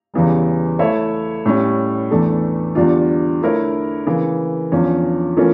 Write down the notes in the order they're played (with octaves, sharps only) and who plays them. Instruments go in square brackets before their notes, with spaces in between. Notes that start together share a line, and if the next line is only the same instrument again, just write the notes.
[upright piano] E2 C#3 E3 G3
A3 E4 A4 C#5 E5
A2 G3 C#4
E2 E3 A3 D4 A4
E2 D3 G3 D4 F4
D3 A3 E4 A#4 C#5
C#3 E3 A#3
E2 D3 F3 C#4
E3 A3 C#4 F4 A#4